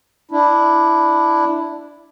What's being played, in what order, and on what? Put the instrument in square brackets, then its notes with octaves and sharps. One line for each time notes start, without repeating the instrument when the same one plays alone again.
[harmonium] D4 E4